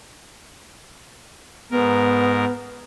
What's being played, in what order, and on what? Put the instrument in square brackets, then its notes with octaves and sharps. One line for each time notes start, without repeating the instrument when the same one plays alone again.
[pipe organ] G#2 A#4 [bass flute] B3